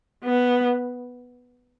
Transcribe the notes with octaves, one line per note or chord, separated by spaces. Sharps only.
B3